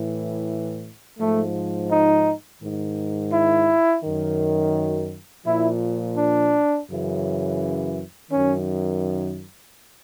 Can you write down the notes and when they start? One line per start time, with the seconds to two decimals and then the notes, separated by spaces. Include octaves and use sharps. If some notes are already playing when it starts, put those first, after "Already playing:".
Already playing: A2 E3
1.19 G#2 F3 A3
1.90 D#4
2.61 G#2 D#3
3.33 E4
4.03 F#2 D#3
5.46 A#2 F3 E4
6.17 D4
6.88 F#2 C#3 E3
8.31 F#2 D#3 C#4